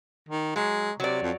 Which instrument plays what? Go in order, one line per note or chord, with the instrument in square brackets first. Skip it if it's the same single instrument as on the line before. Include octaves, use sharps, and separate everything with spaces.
[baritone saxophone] D#3
[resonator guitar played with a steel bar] F#3 [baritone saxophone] G#3
[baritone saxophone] C3 [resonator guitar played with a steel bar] F#3 D5
[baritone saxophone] F2